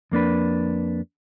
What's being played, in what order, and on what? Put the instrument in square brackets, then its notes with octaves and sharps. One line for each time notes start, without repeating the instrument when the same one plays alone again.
[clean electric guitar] F2 A#3 D4 B4